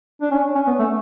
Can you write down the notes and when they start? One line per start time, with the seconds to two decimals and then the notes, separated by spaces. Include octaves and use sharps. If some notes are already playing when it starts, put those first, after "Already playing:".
0.21 D4
0.31 C#4
0.55 C#4
0.67 B3
0.79 A3